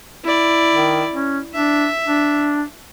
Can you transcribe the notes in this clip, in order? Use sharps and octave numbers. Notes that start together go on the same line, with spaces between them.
E4 D5
D#3
C#4
D4 E5
D4